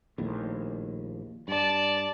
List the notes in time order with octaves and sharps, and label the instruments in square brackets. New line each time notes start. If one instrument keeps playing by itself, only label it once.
[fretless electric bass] A#1 D#2 A2
[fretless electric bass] G2 [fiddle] D5 A5